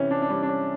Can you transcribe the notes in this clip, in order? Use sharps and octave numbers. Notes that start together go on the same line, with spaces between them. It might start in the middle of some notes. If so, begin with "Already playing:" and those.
Already playing: C3 E3 C#4
D4
D4
G3 C#4
D4
C#4